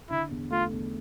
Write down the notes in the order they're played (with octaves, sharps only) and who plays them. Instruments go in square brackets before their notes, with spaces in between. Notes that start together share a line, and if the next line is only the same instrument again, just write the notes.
[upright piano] D3 [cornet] E4
[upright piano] E2
[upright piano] A3 [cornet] F4
[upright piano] E2